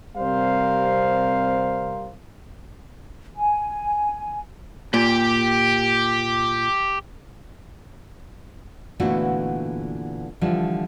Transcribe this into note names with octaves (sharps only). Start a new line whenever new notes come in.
C3 G3 C4 A#4 C5 F5
G#5
A#2 G4
A#2 D3 E3 A3 B3 F#4
D3 E3 F3 G3